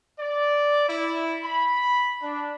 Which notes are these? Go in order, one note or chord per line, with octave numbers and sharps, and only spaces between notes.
D5
E4
B5
D4